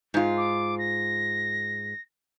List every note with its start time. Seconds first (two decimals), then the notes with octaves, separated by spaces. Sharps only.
0.14 G#2 F4
0.37 D6
0.79 A#6